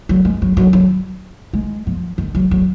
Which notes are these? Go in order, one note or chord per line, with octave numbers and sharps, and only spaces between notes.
F#3
G#3
F#3
F#3
F#3
G#3
F3
D#3
F#3
F#3